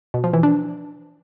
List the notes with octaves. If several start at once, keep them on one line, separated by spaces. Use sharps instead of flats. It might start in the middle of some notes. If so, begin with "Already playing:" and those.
B2
F3
E3
D4